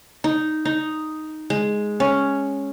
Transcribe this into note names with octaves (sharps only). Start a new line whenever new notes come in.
D#4
D#4
G#3
C#4